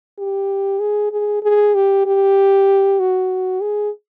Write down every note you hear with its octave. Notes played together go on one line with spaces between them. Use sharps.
G4
G#4
G#4
G#4
G4
G4
F#4
G#4